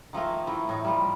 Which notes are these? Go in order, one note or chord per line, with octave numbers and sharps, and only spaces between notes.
D#3 F3 A3 A#3
E3 A3
A2 D#4
F3 G3